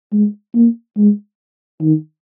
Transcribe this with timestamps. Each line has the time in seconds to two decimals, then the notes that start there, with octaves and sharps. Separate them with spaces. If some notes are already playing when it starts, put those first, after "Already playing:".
0.13 G#3
0.55 A#3
0.98 G#3
1.81 D#3